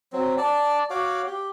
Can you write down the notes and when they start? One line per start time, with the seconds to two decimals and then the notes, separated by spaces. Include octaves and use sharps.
0.13 F#3 C4
0.38 D5 A5
0.90 F#4 C#5 F5 D6
1.27 G4